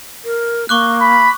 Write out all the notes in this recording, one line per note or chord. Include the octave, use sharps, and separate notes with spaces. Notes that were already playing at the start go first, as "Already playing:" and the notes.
A#4
A#3 C#6 D6 F#6
B5